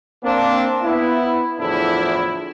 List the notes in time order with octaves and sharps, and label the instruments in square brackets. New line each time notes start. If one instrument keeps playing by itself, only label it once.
[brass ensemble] A#3 C4 D4
B3 E4
E2 A2 D3 F3 D4 E4